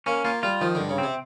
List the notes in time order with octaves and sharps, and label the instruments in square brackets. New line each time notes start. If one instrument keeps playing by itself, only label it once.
[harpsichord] A#3 [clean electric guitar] C#4
[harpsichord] A#3 [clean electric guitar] F4
[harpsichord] G3 [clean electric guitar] F4
[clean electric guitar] D#3 [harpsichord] F3
[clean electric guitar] G2 [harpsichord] D3
[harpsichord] C#3
[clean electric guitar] C4
[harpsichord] C3